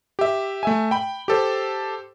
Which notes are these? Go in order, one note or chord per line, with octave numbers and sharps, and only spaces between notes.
G4 E5
A3 E5 G#5
G5 B5
G4 A4 C5